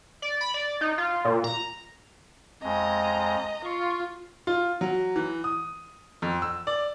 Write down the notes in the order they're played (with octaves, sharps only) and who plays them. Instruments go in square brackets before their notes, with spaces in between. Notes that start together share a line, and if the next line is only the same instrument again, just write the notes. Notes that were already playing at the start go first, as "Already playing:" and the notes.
[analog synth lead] D5
B5
D5
D#4
F4
A#2
A#5
[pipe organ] F2 G#3 [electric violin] D#5 A#5
[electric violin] F4 [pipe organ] C6 C#6
[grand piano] F4
F#3
E3
D#6
F2
E6
D5